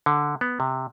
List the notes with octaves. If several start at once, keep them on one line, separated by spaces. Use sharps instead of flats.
D3
B3
C3